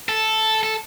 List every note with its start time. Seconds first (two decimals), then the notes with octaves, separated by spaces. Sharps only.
0.09 A4
0.63 A4